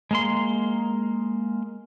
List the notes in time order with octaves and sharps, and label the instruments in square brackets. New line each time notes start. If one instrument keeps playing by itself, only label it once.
[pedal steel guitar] G#3 A#3 C6